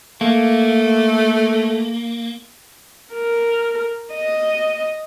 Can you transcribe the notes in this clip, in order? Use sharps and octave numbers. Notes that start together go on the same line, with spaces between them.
A3 A#3
A#4
D#5